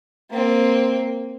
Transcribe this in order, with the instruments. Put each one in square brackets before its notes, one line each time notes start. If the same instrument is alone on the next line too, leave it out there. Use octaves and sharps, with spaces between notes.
[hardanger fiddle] A#3 C4